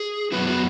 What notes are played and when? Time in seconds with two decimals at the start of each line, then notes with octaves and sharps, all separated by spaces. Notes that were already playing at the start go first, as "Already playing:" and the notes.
Already playing: G#4
0.32 F#2 F#3 B3 E4 F#4 B4
0.47 F#4 B4